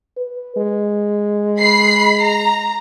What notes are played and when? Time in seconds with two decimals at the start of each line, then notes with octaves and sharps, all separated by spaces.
0.17 B4
0.56 G#3
1.59 B5 C7
2.24 A#5